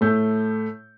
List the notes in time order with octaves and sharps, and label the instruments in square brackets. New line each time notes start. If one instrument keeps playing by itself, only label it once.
[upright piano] A2 A3 G6